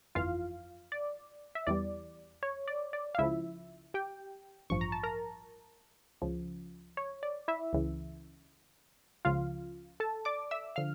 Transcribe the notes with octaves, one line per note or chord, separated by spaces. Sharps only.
G1 F2 E3 F4 F5
D5
E5
E2 E3 G3 D5
C#5
D5
D5
F5
C#2 C#3 F3 E4 E5
G4 G5
A1 G2 F3 C#6
A#5
A5
A#4 A#5
C#2 C#3 F3
C#5
D5
E4 E5
C#2 C#3 E3
C#2 C#3 F3 F4 F5
A4 A5
D5 D6
E5 E6
D3 F3 F5 F6